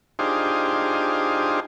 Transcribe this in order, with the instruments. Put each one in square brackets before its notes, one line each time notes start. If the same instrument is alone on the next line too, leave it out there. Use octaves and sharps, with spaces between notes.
[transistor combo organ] D4 D#4 F4 G4 G#4 C5